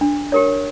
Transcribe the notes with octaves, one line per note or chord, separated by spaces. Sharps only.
D4
G4 A#4 C#5